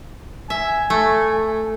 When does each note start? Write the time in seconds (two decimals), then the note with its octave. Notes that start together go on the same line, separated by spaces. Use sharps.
0.50 E5 G#5
0.90 A3